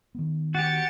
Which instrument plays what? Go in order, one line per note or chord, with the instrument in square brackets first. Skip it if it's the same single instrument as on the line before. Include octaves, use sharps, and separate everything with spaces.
[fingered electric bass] D#3 B3
[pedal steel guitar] F#4 G4 [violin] A6 C#7